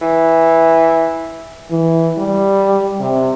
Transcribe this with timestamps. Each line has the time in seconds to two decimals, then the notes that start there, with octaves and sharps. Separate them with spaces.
0.02 E3
1.71 E3
2.18 G3
3.00 C3